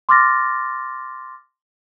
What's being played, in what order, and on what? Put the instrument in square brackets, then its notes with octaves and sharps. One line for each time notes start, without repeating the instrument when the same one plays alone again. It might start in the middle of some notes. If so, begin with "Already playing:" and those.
[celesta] C6 D6 F6 A6 A#6